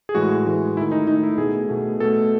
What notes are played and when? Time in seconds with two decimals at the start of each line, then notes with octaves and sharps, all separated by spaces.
0.09 G#4
0.15 A2 E3 G#3 F#4
0.46 A2 E3 G#3
0.76 A3 E4
0.81 D#3
0.92 D#4
1.07 D#3 A3 D#4
1.23 E4
1.38 B2 A3 G#4
1.69 B2 A3
2.00 B2 A3 A4